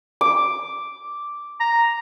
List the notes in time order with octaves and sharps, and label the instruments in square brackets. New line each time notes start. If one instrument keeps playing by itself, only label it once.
[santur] D6
[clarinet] A#5